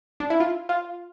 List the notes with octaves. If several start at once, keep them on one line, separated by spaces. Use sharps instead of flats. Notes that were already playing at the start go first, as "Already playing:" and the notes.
D4
E4
F4
F4